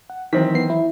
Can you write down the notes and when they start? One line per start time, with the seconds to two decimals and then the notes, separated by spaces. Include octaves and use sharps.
0.10 F#5
0.33 D#3 E3 F#3 C4 B6
0.55 B3 C7
0.70 E4